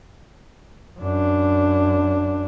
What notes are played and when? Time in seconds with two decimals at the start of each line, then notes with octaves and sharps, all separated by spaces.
0.99 F#2 D4